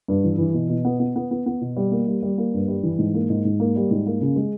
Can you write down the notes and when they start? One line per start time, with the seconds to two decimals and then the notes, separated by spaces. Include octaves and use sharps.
0.08 G2
0.24 E3
0.38 E3
0.54 B2
0.69 B2
0.85 B3
1.00 B3
1.16 B3
1.31 B3
1.46 B3
1.61 B2
1.77 G3
1.92 A#3
2.07 G3
2.22 G3
2.38 A#3
2.54 G2
2.68 G3
2.83 E3
2.99 G#2
3.14 A#3
3.30 G#2
3.45 G#2
3.60 A#3
3.76 G3
3.91 G#2
4.06 A#3
4.21 C#3
4.36 G#3